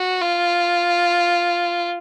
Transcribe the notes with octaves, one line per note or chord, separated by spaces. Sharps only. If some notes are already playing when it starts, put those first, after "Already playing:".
Already playing: F#4
F4